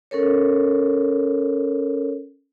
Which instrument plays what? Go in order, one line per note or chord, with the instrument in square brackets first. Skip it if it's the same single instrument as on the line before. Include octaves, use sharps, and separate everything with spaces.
[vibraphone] C#4 A4 A#4 C#5